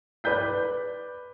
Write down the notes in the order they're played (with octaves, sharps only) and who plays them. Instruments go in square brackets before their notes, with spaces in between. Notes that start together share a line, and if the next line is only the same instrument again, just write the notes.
[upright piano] B4 D5 G6 B6